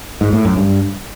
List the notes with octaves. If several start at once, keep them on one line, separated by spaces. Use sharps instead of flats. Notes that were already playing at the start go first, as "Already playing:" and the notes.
G#2
A2
F#2
G2